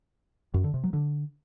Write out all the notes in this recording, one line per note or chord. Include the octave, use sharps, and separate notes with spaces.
F#2
D3
C3
F#3
D3